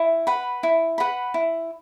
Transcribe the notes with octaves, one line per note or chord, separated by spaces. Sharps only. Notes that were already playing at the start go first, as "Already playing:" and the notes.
Already playing: E4
B4 F#5 B5
E4
B4 F#5 B5
E4